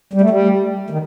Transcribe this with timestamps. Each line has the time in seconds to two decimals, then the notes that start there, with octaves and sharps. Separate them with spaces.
0.13 G3
0.21 A3
0.30 G3
0.90 D#3